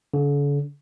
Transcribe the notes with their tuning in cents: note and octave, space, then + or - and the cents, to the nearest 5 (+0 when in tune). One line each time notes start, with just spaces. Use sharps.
D3 -45